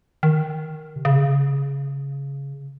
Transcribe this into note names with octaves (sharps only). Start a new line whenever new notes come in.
D#3
C3
C#3